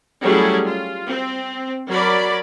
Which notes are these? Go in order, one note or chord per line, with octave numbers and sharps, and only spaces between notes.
F#3 G3 A3 C#4 E4 G#4
F4
C4
F#3 A#4 D5 B5